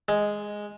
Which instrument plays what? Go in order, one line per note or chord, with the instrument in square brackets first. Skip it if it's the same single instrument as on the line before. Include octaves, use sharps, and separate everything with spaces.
[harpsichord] G#3